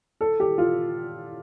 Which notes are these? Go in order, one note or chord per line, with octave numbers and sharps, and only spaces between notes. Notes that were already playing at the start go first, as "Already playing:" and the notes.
A4
G4
F4